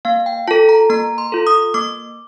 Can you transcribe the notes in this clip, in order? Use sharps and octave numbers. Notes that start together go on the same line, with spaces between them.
A#3 F5
G5
F4 A4 A5
A#5
A#3 A#5
C6
F4 A4
D#6
A#3 D6